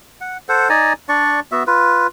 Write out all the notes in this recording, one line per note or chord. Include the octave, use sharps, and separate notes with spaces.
F#5
A4 C5 F#5
D#4 D5 G#5 A#5
D4 D5 C#6
B3 F#4 E5
F4 B4